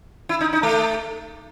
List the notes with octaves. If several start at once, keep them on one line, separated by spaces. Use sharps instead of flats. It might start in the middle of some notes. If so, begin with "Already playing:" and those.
E4
D#4
D#4
A3